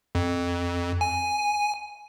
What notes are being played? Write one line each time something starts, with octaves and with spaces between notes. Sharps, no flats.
F2
G#5